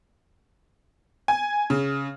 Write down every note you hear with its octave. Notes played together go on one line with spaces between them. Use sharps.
G#5
C#3